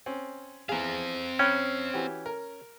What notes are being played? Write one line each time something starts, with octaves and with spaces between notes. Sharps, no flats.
C4 C#4
E2 C4 G#4 F5
C#4 G5 B5 F#6
E3 F#4 G4
A#4